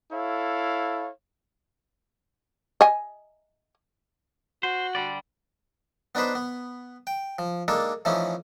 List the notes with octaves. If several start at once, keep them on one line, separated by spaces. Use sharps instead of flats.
E4 A4 C#5 F5
D#5 G#5
F#4 C5
D3 G3 D5
B3 D4 D#4 B4 C5
B3
G5
F3
G#3 A#3 D4 D#4 A4
E3 F3 A3 C#4 D#4